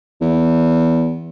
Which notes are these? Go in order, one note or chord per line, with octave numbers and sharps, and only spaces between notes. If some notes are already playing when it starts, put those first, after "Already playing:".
E2